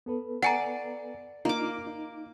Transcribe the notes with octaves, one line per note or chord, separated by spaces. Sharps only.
B3 A4 B4
D5 F#5 G#5 A#5
A#3 D4 D#4 F4 D6
D#4